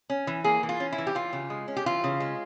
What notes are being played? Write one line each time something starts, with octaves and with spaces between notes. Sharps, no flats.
C#4
E3
A#3 G#4
E3
F4
C#4
E4
E3
G4
E3 F4
C#3
G#3
C#4
G4
E3 F4
C#3
G#3